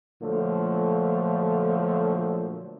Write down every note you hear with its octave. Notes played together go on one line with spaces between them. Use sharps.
A#2 D3 F3 F#3 A3